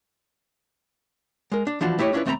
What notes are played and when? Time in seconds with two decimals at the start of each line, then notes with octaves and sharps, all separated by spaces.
1.52 G#3 A#4
1.67 D4
1.81 E3 F3 D4 F4 F#4
1.99 A3 E4 G4 A#4 C#5 D#5
2.13 C#4 D4 E4 F4 B4
2.26 D#2 A3 C4 D#5 A#5 B5